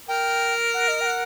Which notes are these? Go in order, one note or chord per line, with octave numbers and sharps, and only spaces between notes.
A#4 G5
F#5
D#5
G5
F#5